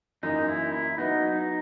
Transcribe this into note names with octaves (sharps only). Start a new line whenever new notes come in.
F#2 E3 A#3 D#4
E4
E4
F#3 B3 D#4 F#4 B4
D#4